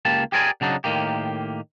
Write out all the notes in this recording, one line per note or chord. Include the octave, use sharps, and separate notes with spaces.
C#2 A#3 G4 A5
G4 G#4 A#4 D5 G#5
C#3 F#3 D4 D#4
A2 D#3 A#3 G4